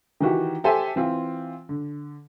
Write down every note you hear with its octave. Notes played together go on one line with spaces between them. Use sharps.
D#3 E3 F#4 G4
G4 A4 C5 E5 G#5
E3 C4 F4
D3